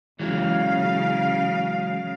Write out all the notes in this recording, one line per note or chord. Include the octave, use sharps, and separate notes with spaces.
C#3 E3 F#3 G#3 F5